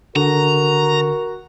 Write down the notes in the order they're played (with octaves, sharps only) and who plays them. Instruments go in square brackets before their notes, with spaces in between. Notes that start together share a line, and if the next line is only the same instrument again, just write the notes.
[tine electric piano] D3 [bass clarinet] F#4 [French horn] A#4 [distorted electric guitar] A#5